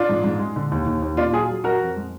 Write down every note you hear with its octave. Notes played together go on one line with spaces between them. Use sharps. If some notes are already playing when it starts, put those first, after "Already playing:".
Already playing: D4 F4
G#2
G#2
G#3
D3
D#2
D#2
D#2
A#2 D4 F4
F#3 F4 G#4
F#3
F#3 F#4 A#4
F2
G#3